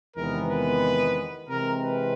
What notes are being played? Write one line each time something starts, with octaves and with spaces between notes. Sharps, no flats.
E2 C3 D#3 G#3 B3 A#4
B4
C3 E3 G#3 C4 A#4
B4